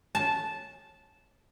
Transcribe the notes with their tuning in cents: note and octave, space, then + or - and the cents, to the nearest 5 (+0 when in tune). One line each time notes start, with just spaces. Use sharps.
A5 -10